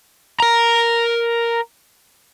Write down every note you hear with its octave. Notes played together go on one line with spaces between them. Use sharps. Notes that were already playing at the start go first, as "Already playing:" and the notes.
A#4 A#5